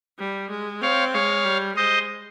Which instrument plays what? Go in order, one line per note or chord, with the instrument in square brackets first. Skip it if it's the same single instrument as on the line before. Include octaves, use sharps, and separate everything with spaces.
[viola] G3
G#3
[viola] C4 [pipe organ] C#5 F5
[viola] G#3 [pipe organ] C#5 F5
[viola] G3
[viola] G#3 [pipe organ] C5 D#5